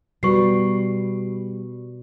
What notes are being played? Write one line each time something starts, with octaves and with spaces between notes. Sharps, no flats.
B2 G3 F#4 B4 C#6 C7